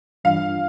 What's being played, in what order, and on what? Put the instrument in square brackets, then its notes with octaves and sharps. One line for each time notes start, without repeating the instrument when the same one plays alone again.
[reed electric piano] G2 E3 G3 D4 F4 [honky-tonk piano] F5